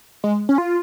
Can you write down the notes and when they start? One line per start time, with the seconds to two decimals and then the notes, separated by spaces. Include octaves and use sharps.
0.24 G#3
0.49 C#4
0.58 F4